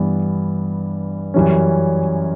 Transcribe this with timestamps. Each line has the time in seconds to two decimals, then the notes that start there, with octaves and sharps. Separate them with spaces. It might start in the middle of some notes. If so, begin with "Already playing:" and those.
Already playing: G2 E3 B3
1.34 F#2 E3 G3 C#4